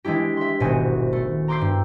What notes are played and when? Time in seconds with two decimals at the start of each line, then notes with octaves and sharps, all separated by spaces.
0.04 E3 G#3 D4 E4 G4
0.37 E5 C6
0.60 D#1 G#1 B2 F#4 C5 G#5
1.13 A3
1.48 A#5 C6 D6 E6 G6 C7
1.61 G2